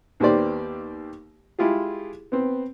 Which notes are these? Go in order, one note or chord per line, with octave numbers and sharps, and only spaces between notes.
D#2 A#3 B3 G4 C5 D5
G#3 E4 F4 G4 G#4
B3 C4